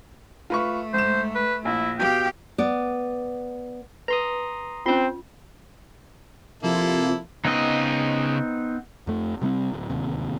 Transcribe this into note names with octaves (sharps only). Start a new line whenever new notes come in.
A3 F4 B4 C#6
G#2 C5 E7
B4
A#1 E4
B2 G4 F5 G5
B3 D5
B4 A#5 C6 D#6
C4 C#4 F4 C6 G6
C3 F3 A#3 E4 F4 A4
C#3 B3 C4 D#4 D#5
F2 A3
C3 G3 B3 C4
D1
D1 D#2 C3